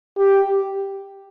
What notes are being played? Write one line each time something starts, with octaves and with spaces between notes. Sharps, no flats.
G4